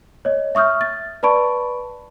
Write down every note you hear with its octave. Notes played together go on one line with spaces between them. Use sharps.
C#5 D#5
E5 C#6 D#6 F6 G6
A6
B4 D5 A5 B5 C#6 D7